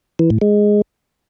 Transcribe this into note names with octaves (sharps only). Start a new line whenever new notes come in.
E3
A2
G#3